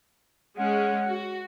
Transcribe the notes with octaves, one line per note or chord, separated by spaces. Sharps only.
G#3 C#4 F#5
F#4